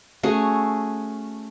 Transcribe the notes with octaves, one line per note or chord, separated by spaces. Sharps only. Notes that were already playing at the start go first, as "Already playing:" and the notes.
A3 C#4 F#4 G#4